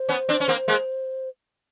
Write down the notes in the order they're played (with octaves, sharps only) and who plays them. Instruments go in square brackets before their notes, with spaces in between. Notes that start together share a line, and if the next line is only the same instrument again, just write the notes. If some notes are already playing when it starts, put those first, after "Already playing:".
Already playing: [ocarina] C5
[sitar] B3 C#4
C4 D4
C#4
A#3 C4
G#3 A#3